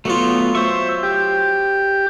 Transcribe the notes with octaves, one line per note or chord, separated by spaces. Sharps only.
F#3 A3 B3 F4
C5 E5 C#6
G4